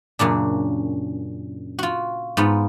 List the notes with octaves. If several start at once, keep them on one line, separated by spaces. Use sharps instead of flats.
F#2 A#2 C#3 D4
F4 F#4
G#2 B3 F4